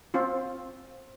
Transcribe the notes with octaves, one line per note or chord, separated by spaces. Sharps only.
C4 F4